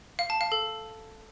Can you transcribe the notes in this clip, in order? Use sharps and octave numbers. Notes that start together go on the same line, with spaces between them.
F5
A5
F5
A4